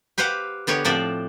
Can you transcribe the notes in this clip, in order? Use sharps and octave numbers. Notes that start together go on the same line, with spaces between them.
G4 B4 C5 F5 F#5
D3 B3 G4 C#5
A2 F3 C4 F#4 D5 E5